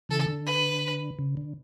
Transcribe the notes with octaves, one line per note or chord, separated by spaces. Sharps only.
C#3 E3 A4
D3
B4
C#3
D3